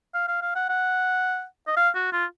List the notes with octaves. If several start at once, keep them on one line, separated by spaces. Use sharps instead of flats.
F5
F5
F5
F#5
F#5
D#5
F5
F#4
F4